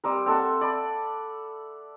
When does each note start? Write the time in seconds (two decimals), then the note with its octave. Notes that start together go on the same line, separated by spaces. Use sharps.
0.04 G3 C4 A#4
0.26 C4 A4 E5 F#5
0.61 D5 B5